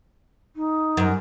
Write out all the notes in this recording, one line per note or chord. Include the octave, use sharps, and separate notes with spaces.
D#4
F#2